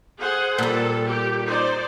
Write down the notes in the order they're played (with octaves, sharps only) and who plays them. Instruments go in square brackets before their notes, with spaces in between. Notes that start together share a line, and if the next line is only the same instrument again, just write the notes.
[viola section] G#4 C5 F#5
[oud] A#2 G3 [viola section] A4
[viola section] G4
D#4 C5 D5